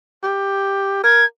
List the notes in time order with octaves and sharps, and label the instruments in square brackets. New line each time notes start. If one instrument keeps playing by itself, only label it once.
[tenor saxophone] G4
[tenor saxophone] A#4 [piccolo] G#6